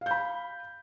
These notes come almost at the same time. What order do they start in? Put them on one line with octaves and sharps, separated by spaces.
F5 G6 B5